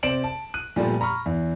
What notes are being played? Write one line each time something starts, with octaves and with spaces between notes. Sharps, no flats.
C3 C5 D5 D7 E7 F#7
A5
F#6 D#7
A#2 F3 G3 A3 B3 F4
A#5 B5 C#6 F6
E2